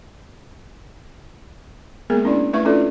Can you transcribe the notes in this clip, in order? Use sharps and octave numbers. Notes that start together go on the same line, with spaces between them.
G#3 A#3 B3 G#4 A#4
C#4 D4 E4 D5
A3 E4 B4 E5 C#6
C#4 D4 E4 F4 A4 D5